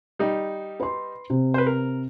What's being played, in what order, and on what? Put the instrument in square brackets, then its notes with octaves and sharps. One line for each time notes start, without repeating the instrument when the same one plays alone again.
[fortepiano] G3 D#4
[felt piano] B4 C6
C3
[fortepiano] B4 C5
A#4